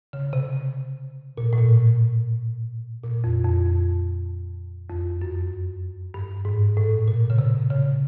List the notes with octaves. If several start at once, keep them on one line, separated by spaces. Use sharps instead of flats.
C#3
C3
A#2
A2
A#2
A#2
F2
F2
F2
F2
F#2
G2
G#2
A2
A#2
C#3
C3
C#3